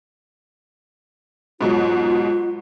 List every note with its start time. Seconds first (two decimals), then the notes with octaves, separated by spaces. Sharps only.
1.61 G#2 B2 F#3 F4